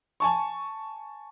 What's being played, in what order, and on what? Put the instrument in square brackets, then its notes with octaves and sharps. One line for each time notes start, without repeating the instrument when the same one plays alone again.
[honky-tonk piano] G#5 A5 C#6